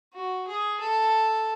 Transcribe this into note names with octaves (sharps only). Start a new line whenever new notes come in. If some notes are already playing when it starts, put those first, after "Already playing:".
F#4
G#4
A4